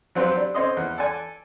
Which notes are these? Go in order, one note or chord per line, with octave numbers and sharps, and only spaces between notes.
F#3 C4 G4 B4 F5
D4
C4 C#4 D#5 C6 D#6
E2
A4 D5 G#5